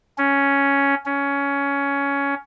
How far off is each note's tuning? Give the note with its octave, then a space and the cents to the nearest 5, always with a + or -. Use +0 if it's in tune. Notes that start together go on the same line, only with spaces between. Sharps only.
C#4 +5
C#4 +15